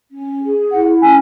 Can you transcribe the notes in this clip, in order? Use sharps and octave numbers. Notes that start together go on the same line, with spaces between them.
C#4
G#4
E4 F#5
C#4 G#5